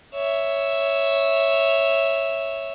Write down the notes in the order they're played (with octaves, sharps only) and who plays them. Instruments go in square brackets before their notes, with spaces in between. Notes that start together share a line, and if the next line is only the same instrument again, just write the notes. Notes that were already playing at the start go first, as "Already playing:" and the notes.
[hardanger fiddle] C#5 E5